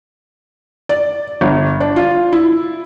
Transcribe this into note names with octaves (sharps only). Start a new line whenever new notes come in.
D5
G1
D4
F4
E4